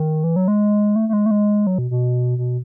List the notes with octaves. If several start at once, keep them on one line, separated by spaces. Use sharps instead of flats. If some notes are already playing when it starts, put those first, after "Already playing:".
Already playing: D#3
E3
F#3
G#3
A3
A3
G#3
A3
G#3
F#3
B2
B2
B2